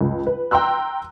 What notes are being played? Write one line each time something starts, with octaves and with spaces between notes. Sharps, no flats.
C#2
B4
G5 A#5 C6 E6 F#6